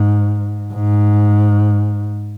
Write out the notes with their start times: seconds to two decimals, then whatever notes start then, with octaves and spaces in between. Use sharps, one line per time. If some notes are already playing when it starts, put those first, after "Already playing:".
Already playing: G#2
0.73 G#2